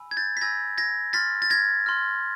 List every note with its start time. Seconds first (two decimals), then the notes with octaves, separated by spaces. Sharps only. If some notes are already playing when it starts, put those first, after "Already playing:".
Already playing: G#5 B5 E6
0.11 G#6
0.17 G6 A6
0.37 B6
0.41 G#5 B5 E6 G6 G#6 A#6
0.78 G#6 A#6
1.13 C6 F6 A6 B6
1.42 A6
1.50 G#6 A#6
1.86 C6 F6